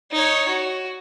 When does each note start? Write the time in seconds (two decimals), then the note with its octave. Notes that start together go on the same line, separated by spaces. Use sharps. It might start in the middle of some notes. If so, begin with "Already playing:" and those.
0.12 D#4 C#5
0.48 F#4